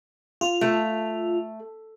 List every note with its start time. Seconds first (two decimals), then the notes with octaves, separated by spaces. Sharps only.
0.41 F4
0.61 A3